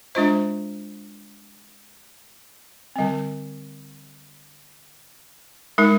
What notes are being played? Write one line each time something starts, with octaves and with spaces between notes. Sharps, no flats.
G#3 D4 F4 C5 D#5
D3 G3 C4
G#3 D#4 A#4